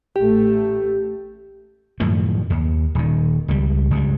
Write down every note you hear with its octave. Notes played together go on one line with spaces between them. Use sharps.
A1 A3 G4
F#2 A2 D#3 F3
D#2
D#1 D#3
C#2 G3
C#2 G2